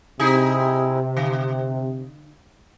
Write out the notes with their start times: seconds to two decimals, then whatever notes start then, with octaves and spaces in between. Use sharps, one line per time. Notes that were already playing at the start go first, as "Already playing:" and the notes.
0.20 C3 D#4 E4 G#4
1.17 D3